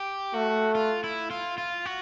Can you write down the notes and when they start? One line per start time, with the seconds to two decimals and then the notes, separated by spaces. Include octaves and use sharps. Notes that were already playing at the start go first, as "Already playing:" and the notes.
Already playing: G4
0.34 A3 F#4
0.75 F4
1.04 E4
1.31 F4
1.58 F4
1.86 F#4